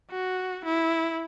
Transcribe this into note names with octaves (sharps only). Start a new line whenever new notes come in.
F#4
E4